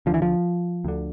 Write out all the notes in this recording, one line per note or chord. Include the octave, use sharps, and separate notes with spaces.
D2 D3 F3
E3
F3
D2 D3